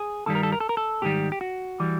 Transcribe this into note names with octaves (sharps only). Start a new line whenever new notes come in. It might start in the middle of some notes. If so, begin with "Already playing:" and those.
Already playing: G#4
G2 D#3 G3 A4
A#4
A4
A#4
A4
A#4
A4
G#2 D#3 G3 G4
G4
F#4
E3 G3